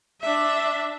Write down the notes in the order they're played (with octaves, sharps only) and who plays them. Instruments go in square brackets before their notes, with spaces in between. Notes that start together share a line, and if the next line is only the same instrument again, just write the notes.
[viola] D4 E5